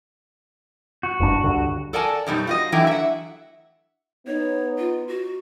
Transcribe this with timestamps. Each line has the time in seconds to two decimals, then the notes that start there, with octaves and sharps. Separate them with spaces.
1.03 F#4
1.20 F#1 G2 D4
1.44 C#2 G2 D3
1.93 A4 A#4 D5 F#5 G#5 A5
2.27 F#2 B2 G3 D#4
2.47 F4 F#4 D#5
2.72 D3 E3 F#3 A3 E4 G5
2.87 E5 F#5
4.27 B3 D#4 C#5
4.78 F4
5.08 F#4